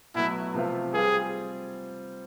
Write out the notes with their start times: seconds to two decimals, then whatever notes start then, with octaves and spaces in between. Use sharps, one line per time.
0.15 B2 F#3 A3 E4
0.54 C3 F3 A3 C4 F4
0.93 G3 C4 F4 G#4